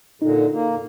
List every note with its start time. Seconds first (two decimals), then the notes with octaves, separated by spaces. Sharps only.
0.22 A#2 D3 D#4
0.53 A#3